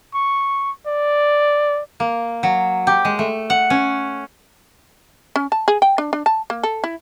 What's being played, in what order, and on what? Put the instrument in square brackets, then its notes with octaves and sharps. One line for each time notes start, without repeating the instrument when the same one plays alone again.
[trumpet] C#6
D5
[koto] A#3
F#3
G4
G#3
A3
F#5
C#4
[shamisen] C#4
A5
G#4
G5
D4
D4
A5
A#3
A4
E4